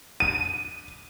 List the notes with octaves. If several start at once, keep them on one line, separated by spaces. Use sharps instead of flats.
D#7